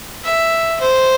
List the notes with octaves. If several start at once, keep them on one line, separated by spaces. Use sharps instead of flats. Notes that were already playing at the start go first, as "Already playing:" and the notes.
E5
C5